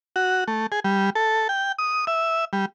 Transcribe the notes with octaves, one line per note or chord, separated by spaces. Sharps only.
F#4
A3
G#4
G3
A4
G5
D#6
E5
G3